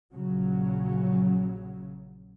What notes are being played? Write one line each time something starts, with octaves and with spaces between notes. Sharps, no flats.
A#1 C#3 F#3